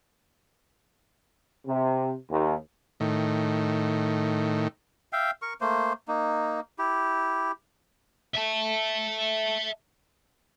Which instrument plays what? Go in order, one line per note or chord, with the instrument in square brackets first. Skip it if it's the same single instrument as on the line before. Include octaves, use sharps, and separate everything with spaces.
[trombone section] C3
D#2
[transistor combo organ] A2 D#3
[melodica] E5 F5 G5
A#4 C#6
A3 A#3 C5
A#3 D#4
E4 G4
[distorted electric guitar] E5 A5